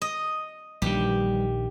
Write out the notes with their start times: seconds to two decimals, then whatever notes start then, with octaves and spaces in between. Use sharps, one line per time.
0.02 D#5
0.82 A#1 G2 D#3 E3 G3 G4